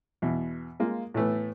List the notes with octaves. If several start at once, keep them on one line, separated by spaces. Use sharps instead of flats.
E2 B2
G#3 A#3 F4
A2 E3 A3 B3